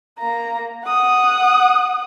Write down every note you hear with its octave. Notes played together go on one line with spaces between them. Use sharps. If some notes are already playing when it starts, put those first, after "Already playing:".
A#3 A#5
F#5 D#6